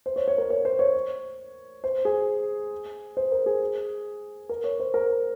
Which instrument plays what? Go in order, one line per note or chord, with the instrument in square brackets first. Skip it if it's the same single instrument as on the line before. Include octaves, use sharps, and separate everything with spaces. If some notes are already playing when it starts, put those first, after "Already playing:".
[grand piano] C5
C#5
C#5
A#4
C#5
C5
C#5
C5
G#4
C5
A#4
G#4
A#4
C#5
C5
A#4